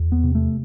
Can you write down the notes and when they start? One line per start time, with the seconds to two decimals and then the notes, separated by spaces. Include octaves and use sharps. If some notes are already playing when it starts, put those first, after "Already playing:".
Already playing: E2
0.12 B3
0.24 C3
0.35 A3